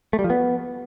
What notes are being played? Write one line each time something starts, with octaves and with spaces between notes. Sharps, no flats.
A3
G3
F3
B3